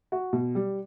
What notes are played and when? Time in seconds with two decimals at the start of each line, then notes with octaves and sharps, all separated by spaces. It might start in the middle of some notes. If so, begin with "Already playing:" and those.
0.12 F#4
0.33 B2
0.55 G3